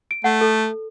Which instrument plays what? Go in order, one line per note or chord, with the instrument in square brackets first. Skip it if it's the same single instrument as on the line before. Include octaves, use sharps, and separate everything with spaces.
[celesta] D7
[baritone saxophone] A3 [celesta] F#5
[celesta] A4